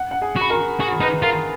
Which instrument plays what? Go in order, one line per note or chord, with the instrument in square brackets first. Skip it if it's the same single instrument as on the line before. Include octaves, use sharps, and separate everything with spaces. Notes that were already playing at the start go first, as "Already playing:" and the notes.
Already playing: [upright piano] F#5
F#5
G#4 G#5
[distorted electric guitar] F#4 [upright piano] B5
[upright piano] A#4 A#5
[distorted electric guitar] F#4 [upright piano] G#4 G#5
[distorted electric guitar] D#4 [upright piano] B4 B5
[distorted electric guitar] F4 [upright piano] A#4 A#5